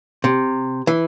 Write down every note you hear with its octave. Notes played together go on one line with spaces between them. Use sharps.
C3
E3